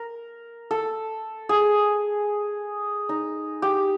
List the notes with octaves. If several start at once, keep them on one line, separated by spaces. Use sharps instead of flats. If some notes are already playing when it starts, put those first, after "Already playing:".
Already playing: A#4
A4
G#4
D#4
G4